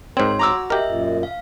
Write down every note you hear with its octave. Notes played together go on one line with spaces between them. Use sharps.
G#2 C4 A#4 C#5 C6 G#6
F#4 A#5 D6 E6
G4 A#4 D#5 E5
F#2 A#2
F5